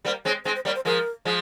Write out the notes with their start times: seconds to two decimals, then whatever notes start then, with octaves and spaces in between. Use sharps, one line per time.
0.05 G3 A#3 C5
0.25 G#3 C4 C#5
0.45 G#3 C4 C5
0.55 C5
0.65 G3 A#3 C#5
0.75 C5
0.85 F3 G#3 A#4
1.25 F3 G#3